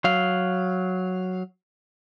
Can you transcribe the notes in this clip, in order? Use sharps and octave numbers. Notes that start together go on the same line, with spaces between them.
F#3 F5